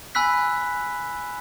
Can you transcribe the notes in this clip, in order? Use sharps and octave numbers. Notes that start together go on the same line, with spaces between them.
G#5 B5 E6 F#6 B6